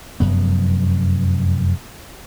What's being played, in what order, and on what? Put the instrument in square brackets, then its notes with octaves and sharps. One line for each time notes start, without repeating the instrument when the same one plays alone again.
[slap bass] F1 F#2 B3